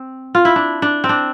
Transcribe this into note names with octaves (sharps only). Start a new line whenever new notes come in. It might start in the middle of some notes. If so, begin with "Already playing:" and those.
Already playing: C4
F4
E4
D4
D4
C4
D4